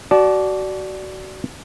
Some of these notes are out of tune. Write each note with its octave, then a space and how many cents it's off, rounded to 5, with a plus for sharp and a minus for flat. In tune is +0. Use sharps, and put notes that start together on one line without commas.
F#4 +25 D5 +0 A5 -20